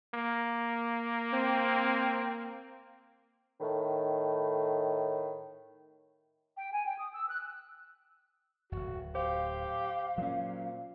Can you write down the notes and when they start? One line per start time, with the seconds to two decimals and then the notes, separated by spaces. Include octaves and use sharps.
0.14 A#3
1.32 C4
3.61 A2 D#3
6.58 G5
6.72 G#5
6.85 G5
6.99 D#6
7.15 E6
7.29 F#6
8.72 D1 G#1 F#4
9.15 G4 C5 F5
10.18 A#2 F#3 C#4